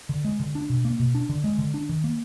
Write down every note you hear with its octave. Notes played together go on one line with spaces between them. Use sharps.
D3
G#3
D3
D4
B2
A#3
B2
D4
D3
G#3
D3
D4
D#3
A#3